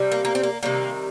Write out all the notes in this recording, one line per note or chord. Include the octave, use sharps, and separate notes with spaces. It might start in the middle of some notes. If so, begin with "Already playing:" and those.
Already playing: C3 G3
A#3
A#3
C4
A#3
C3 D#3 G3 A#3